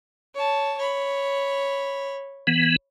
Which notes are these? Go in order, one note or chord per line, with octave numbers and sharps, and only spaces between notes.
C#5 A5
C#5 B5
E3 B3